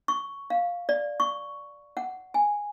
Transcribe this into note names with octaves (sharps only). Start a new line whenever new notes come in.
C#6
F5
D5
C#6
F#5
G#5